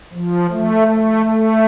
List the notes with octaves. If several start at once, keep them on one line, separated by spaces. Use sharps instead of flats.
F3
A3
A3
A3